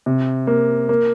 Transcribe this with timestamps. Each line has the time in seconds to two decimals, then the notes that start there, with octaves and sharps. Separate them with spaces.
0.06 C3
0.47 A#3
0.89 A#3